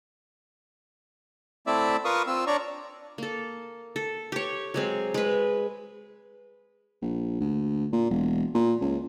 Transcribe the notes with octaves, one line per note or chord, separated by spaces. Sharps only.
A3 C4 E4 D5 E5
F4 A#4 B4 F5 C#6 D#6
C4 F4 E6
D4 C#5 D5 A#5 C#6
A#3 A4
A4
G4 C#5
F#3 G#3 C4
G#3 B4
A#1
D2
A#2
E1
A#2
C#2